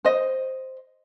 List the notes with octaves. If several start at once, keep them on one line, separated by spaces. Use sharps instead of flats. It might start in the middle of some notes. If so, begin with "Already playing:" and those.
C5 D#5